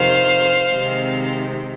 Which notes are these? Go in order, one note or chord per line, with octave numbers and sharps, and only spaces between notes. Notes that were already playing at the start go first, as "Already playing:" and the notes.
Already playing: F2 C3 D#3 C5 F5
C3 D#3 G#3 C4